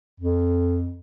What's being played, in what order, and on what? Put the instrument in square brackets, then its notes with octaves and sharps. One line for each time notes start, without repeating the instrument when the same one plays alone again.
[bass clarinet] F2